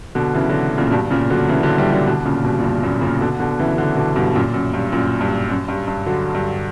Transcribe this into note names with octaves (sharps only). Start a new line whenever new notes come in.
B2 D3
C#3 E3
D3 F#3
A#2 C#3
G2 B2
A#2 C#3
D3 F#3
C#3 E3
D3 F#3
E3 G3
D3 F#3
B2 D3
A#2 C#3
G2 B2
A#2
G2
F#2 A#2
A#2 C#3
B2 D3
B2 D3
C#3 E3
D3 F#3
B2 D3
G2 B2
F#2 A#2
F#2
G2
F#2 A#2
G2
F#2
G2
G2
D3 F#3
G2